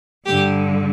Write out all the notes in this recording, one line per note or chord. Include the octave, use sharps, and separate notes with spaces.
G2 D3 G4